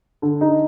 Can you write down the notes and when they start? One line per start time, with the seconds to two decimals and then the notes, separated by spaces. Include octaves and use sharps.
0.22 D3
0.41 D#4